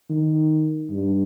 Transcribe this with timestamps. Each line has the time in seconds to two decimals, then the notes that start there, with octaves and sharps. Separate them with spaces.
0.10 D#3
0.91 G2